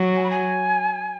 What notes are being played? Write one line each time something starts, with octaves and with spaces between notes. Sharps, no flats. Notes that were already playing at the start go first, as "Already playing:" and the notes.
Already playing: F#3
G#5
B5
G#5